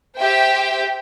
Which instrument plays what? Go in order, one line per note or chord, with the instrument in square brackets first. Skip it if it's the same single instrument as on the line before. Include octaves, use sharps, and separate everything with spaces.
[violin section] G4 C5 E5 G5